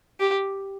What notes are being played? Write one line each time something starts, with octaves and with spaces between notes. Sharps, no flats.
G4